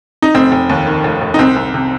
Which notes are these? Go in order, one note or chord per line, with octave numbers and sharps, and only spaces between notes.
D#4
F1 C4
F1
D#2
D#3
F1
F1
D#4
C2 C4
C2
C3